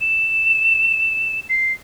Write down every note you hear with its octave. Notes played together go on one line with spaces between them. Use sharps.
E7
C7